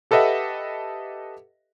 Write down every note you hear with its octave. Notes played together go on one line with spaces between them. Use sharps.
G4 A4 B4 D#5 E5 F#5